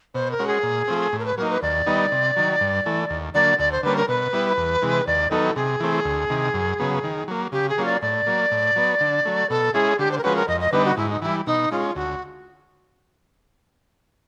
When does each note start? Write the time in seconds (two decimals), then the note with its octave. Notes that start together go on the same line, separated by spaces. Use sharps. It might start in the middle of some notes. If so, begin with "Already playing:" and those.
0.14 B2 C5
0.31 A#4
0.39 G#3 C#4 F#4
0.47 G#4
0.63 A#2
0.88 F3 A3 C4
1.13 A2
1.19 A#4
1.25 B4
1.38 F#3 A#3 D#4 A#4
1.50 B4
1.62 D#2 D5
1.86 D#3 G3 B3 D#4
2.12 C3
2.36 D#3 F#3
2.61 G2
2.86 E3 A3
3.10 D#2
3.34 D3 F#3 A#3 D5
3.59 D2 D5
3.72 C5
3.83 D3 G3 A#3 C#4 B4
3.96 A#4
4.08 B2 B4
4.33 G3 B3 E4
4.57 E2
4.82 C3 E3 G#3
5.07 D#2 D5
5.31 D#3 F#3 B3 D#4 A4
5.56 C3 G#4
5.80 E3 A3 C4
6.05 D2
6.30 C3 D#3
6.54 F#2
6.80 C#3 F#3 B3
7.04 D#3
7.28 F#3 A#3
7.52 C#3 G4
7.69 G#4
7.78 F#3 A#3 C#4 F4
7.85 D5
8.02 A2 D5
8.26 F#3 A#3
8.51 A2
8.76 F#3 B3
9.01 D3
9.25 F#3 A3
9.50 B2 A4
9.74 G#3 C#4 E4 G#4
9.99 D3 G4
10.11 C5
10.18 A#4
10.24 F3 G#3 C#4 F#4 B4
10.36 A#4
10.48 F2 D#5
10.60 D#5
10.72 D3 G3 B3 D#4 B4
10.85 F#4
10.97 G#2 E4
11.10 D#4
11.22 E3 G3 E4
11.47 B2 D#4
11.72 G#3 C#4 F4
11.95 D2 F#4